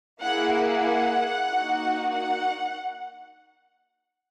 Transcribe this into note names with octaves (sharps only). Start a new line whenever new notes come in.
A#3 E4 G#4 F#5
F#5
A#3 D#4 F#4
F#5